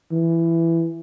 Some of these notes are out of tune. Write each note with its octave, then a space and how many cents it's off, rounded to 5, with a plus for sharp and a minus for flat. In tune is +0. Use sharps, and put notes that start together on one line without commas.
E3 +10